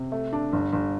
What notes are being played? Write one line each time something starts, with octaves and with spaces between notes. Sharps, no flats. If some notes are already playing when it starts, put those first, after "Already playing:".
Already playing: C3
A3
D4
G1
G1